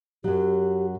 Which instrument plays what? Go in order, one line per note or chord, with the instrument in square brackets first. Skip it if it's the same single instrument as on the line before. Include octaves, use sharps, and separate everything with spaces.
[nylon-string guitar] F#2 F#3 [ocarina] G4